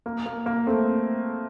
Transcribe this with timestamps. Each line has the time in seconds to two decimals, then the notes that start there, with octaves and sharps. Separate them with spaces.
0.06 A#3
0.26 A#3
0.46 A#3
0.67 A3 C4